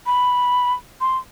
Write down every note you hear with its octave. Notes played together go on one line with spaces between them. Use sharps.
B5
C6